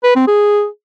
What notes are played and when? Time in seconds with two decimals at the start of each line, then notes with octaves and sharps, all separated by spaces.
0.04 B4
0.16 C4
0.28 G#4